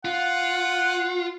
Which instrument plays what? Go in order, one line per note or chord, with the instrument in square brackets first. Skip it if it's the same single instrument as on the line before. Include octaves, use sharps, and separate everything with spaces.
[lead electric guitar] F4 [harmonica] F#5